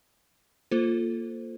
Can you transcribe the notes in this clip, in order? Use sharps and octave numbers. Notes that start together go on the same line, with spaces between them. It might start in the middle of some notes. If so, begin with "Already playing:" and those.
A#3 F4 A4 C5